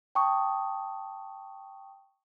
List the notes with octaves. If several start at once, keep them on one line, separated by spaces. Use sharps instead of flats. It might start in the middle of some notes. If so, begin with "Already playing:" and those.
G5 A5 C#6 D#6